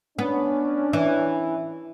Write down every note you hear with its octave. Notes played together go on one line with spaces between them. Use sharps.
B3 C#4 D4
E3